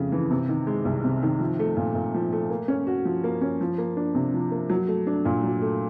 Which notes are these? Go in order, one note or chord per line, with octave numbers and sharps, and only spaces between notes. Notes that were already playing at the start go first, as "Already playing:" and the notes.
Already playing: F2 C#3 A3
E3
C3
D#3
G#3
C2
C3
D#3
F3
A3
A#2
A#2
F3
A3
A#3
C#4
F#4
F3
A#3
C#4
F3
A#3
D4
C3
F3
A#3
F#3
A3
D4
A#2
F#3
A3